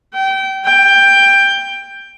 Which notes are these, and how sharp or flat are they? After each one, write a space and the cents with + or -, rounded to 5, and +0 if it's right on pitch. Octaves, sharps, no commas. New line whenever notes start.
G5 -25
G5 +15